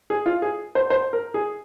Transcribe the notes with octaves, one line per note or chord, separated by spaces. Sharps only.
G#4
F4
G#4
C5
C5
A#4
G#4